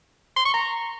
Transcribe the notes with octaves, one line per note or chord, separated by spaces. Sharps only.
C6
C#6
A#5